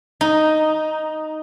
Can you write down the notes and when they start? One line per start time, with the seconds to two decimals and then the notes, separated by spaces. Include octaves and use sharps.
0.21 D#4